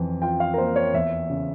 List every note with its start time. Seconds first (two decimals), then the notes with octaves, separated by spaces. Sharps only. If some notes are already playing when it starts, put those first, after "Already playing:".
Already playing: F2 E3
0.22 F4 G5
0.40 F5
0.54 A#4
0.58 A#3 C5
0.76 C#5
0.94 E2 E5
1.30 C#3